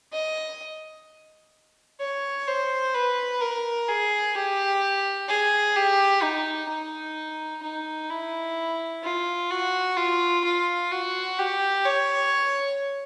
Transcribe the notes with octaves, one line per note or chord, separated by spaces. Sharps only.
D#5
C#5
C5
B4
A#4
G#4
G4
G#4
G4
D#4
D#4
D#4
E4
F4
F#4
F4
F4
F#4
G4
C#5